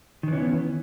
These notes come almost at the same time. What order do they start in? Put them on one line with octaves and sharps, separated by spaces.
D#3 E3 C#4 B3